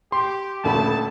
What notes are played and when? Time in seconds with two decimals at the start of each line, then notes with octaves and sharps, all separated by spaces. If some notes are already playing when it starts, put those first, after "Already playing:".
0.12 G4 C6
0.64 D#1 D2 A3 A5 B5